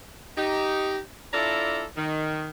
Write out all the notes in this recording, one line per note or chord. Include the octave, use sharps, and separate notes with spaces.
D#4 G4
D4 E4 F4 A4 D5 A#5
D#3